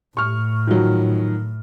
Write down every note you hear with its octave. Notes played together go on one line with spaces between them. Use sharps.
A2 C#6 F6
D#3 F3 F#3